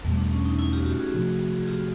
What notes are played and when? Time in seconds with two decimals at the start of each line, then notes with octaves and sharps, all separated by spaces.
0.04 E2 B2 G3 A3
0.18 D4
0.31 C#4
0.45 D#4
0.59 E4
0.73 F4 G4
0.81 F#4
0.86 F4 G4
1.00 F#4 G#4
1.14 C3 F3 A3
1.61 G#4
1.67 F4 G4